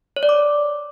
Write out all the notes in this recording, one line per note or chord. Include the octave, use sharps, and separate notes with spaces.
C#5
D5
D6